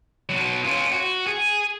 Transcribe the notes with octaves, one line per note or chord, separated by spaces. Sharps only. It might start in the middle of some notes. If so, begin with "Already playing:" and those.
B2 F#3
C#4 F4
F#4
G#4